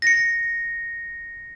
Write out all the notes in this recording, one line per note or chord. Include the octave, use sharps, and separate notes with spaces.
A#6 C#7